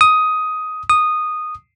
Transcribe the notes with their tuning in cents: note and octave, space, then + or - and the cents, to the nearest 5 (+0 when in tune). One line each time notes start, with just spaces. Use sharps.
D#6 +10
D#6 -10